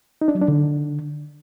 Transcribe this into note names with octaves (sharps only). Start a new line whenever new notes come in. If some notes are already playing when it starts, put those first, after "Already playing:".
D#4
D4
F#3
D4
D3